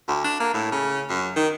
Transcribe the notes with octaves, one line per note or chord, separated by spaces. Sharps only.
D2
D4
A#3
A2
C#3
F#2
D#3